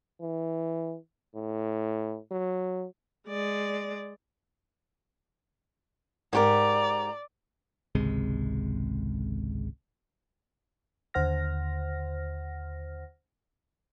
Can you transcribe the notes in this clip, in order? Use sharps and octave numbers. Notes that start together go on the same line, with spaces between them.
E3
A2
F#3
G#3 D5
G#2 G4 A#4 D5 A#5
G#1 C#2 C3 G#3
D#2 D3 C5 F#5 F6 A#6